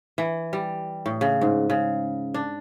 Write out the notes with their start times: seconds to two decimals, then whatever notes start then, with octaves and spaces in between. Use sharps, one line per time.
0.18 E3
0.53 G3
1.06 A2
1.21 C#3
1.41 G#2
1.70 C#3
2.34 D4